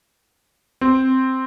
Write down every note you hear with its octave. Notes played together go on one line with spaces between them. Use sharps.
C4